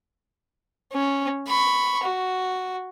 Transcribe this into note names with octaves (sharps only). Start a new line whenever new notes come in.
C#4
B5 C#6
F#4